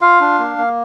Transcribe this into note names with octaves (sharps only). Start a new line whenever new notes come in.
F4 F5
D4
A#3
A#3